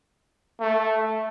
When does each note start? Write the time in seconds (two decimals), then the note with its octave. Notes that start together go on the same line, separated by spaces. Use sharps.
0.60 A3